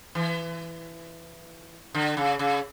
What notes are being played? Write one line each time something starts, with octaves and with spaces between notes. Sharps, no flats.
E3
D3
C#3
C#3